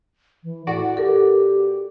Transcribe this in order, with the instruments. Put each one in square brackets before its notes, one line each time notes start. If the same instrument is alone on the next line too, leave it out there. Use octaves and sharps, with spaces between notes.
[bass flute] E3
[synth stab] A2 F#4 D5 [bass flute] F#5
[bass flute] G4 [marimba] A4 A#4